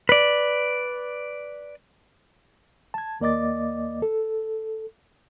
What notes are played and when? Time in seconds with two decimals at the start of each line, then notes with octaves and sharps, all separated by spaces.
0.09 B4 D5
2.94 A5 G#6
3.20 D#2 A#3 D5 D#5 D6 A6
4.02 A4